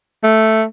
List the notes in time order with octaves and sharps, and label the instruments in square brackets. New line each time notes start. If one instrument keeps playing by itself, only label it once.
[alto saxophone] A3